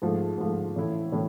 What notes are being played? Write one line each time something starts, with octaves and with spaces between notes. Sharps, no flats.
G#2 F3 A3
G#2 F3 A3
A2 E3 A3 C#4 E4
A2 E3 A3 C#4 E4